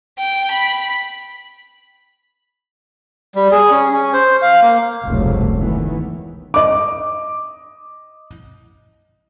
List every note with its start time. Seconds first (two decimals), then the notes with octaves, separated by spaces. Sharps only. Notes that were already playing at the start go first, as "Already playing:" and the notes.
0.19 G5
0.52 B5
3.35 G3
3.51 G#4
3.71 C#4
3.92 C#4
4.13 C5
4.42 F5
4.62 A#3
5.04 F1 C#2 G2 B2 F#3 A3
5.56 D#3 E3 B3
6.54 D#5 D6